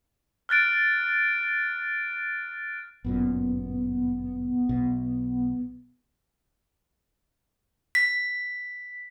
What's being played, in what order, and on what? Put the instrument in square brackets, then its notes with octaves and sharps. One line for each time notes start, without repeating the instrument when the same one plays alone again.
[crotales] F6 F#6 A6 D7
[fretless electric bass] G1 F#2 A#2 [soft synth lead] B3
[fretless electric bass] B1 B2
[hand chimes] B6